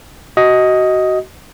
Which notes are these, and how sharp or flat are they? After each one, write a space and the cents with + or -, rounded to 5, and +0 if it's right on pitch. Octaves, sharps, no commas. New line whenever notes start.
F#4 +20 D#5 +10